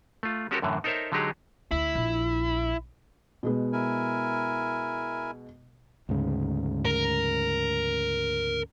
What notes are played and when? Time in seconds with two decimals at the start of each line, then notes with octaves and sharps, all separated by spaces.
0.23 A3 F4
0.51 G#3 C#4 F#4 G4 A4 A#4
0.62 F#2 A2 D3 E3
0.84 D#4 A4 A#4 C5 C#5 E5
1.12 D3 F#3 G#3 D#4 G4 G#4
1.71 D2 E4
1.95 A#1
3.43 B2 G#3 B3
3.73 E4 A#4 G#5
6.09 D2 G#2 C#3
6.85 A#4